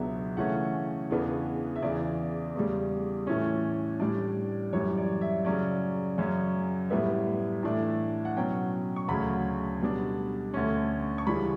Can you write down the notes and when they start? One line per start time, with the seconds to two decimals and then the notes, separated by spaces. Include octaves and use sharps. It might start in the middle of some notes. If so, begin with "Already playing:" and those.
Already playing: C#2 B2 F#3 B3 D4 E5
0.37 C#3 E3 A3 C#4 F#5
1.09 E2 C#3 E3 B3 D4
1.76 E5
1.82 E2 C#3 E3 D5
2.54 E2 C#3 G3
3.27 A2 E3 A3 C#4
3.99 A2 G3 D4 D5
4.73 F#2 E3 G3 C#5
4.98 D5
5.21 E5
5.45 C#3 F#3 C#4 D5
6.18 F#2 C#3 F#3 C#4
6.90 A2 G3 B3 E5
7.63 A2 E3 A3 D4
8.25 F#5
8.36 B2 F#3 C#4 G5
8.96 C#6
9.08 D2 C#3 F#3 C#4 B5
9.81 B2 G3 D4
10.54 D2 D3 A3 C#4
11.18 C#6
11.27 C#3 E3 G3 B5